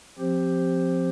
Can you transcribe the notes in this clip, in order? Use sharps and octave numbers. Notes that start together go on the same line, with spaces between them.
F3 C4 G4 C5